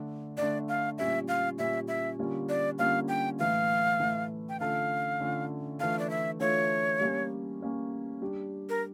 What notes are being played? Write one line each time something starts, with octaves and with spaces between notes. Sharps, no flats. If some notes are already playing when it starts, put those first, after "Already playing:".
Already playing: D3 A3 D4
D3 A3 D4 D5
F5
A#2 G3 C#4 E5
F5
A#2 G3 C#4 E5
E5
D3 G3 A#3 C#4 F4
D5
D3 G3 A#3 C#4 F4 F5
G5
A2 E3 A3 F5
A2 E3 A3
G5
D3 A3 C#4 F4 A4 F5
D3 A3 C#4 F4 A4
E3 A3 D4 F4 A4 F5
D5
E5
E3 A3 D4 F4 A4 C#5
G3 A#3 C#4 G4
G3 A#3 C#4 G4
G3 D4 G4
A#4